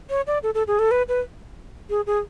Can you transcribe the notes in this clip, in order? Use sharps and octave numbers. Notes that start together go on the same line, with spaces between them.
C#5
D5
A4
A4
G#4
A4
B4
B4
G#4
G#4